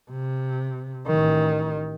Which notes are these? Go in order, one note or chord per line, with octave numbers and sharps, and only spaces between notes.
C3
A1 D#3